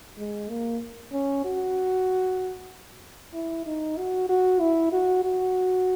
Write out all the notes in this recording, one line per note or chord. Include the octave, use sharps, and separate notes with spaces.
G#3
A#3
C#4
F#4
E4
D#4
F#4
F#4
E4
F#4
F#4